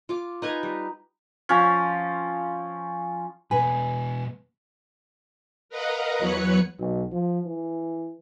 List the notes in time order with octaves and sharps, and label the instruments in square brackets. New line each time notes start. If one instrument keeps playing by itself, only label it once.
[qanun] F4 D6
D#4 B4 G#5 A#5
G3
[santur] F3 C#4
[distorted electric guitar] E2 B2 [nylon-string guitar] B4 [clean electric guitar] G#5
[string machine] A#4 B4 D#5 F5 F#5 A#5
E2 F#3 B4 C#5 F#6 C#7
[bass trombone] B1
F3
E3